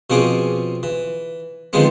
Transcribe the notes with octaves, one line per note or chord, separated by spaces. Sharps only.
B2 F3 C4 C#4 G#4 D6
E3
D3 D#3 F3 G#3 B3 C4